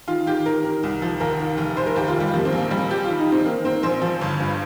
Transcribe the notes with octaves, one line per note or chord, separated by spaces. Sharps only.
D#3 F4
D#3 G4
D#3 A#4
D#3
C2
F3
D#2 A#4
D#3
F1
F1 C5
A#4
D#2 G4
F4
D#2
G3
F3 A#3
C4
A#1
A#3
A#1 G3
F3 G4
D#3 F4
D#4
D#3
C4
D#3 A#3
D#3 C4
A#1 C5
F3
G1
G2